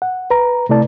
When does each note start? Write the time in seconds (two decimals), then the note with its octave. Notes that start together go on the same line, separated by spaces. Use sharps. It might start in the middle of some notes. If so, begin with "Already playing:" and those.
0.02 F#5
0.30 B4 A#5
0.69 C3 A3 E4 D5 A5